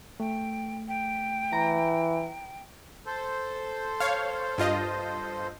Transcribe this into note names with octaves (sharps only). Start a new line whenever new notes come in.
A3 G5
G5
E3 A#5
A4 C5
C#5 F5
G2 F4 D#5